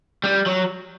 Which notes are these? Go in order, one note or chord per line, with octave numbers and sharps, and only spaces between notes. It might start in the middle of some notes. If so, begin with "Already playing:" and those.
G3
F#3